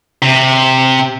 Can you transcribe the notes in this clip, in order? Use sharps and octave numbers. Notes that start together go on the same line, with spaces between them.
C3